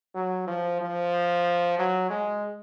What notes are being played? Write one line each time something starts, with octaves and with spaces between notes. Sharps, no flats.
F#3
F3
F3
F#3
G#3